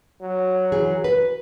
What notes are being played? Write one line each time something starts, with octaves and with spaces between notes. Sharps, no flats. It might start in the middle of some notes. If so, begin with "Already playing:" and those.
F#3
E3 G#4
B4